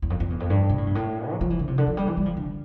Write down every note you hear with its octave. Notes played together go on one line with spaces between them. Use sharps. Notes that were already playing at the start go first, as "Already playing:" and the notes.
E2
F2
F2
E2
F2
G2
B2
A2
G2
A2
G3
F3
E3
D3
C3
D3
F3
G3
E3
G3
F3
D3